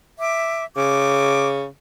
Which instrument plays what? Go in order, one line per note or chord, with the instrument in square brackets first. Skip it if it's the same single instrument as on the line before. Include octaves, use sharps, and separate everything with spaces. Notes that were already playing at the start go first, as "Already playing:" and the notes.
[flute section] E5 D6
[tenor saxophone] C#3 [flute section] D6